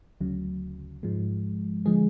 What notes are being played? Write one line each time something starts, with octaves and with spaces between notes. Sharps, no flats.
D2 C#3 F#3
G#2 F3 G#3
D3 F3 G#3 G#4